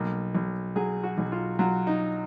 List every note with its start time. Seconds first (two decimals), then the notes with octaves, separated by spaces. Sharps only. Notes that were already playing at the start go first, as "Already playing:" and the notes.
Already playing: B1 A#3
0.35 B1
0.76 F#3 G#4
1.03 F#4
1.18 B1
1.32 F4
1.59 F#3 F4
1.87 D#4